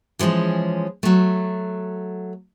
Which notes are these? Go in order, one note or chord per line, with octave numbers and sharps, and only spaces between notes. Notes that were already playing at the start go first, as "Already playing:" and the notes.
E3 F3 G3 G#3 C#4
F#3 A3